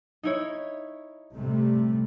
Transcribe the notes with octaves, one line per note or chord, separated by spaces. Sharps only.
D#4 E4 C#5
C3 G3 A3